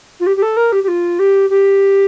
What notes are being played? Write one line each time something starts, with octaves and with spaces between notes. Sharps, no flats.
F4
G4
G4
A4
A#4
G4
G4
F4
G4
G4